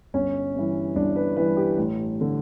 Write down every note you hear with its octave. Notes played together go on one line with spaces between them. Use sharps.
G1 C#4
G2 E3
G1 D4
B4
G2 E3 B4
G4
A1
D3